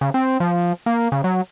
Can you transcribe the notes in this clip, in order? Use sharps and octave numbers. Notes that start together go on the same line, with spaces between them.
C#3
C4
F3
A#3
C#3
F#3